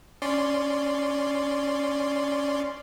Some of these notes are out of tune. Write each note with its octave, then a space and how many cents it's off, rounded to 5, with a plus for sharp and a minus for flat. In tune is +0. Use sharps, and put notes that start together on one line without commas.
C#4 +5 D5 +0 C6 -5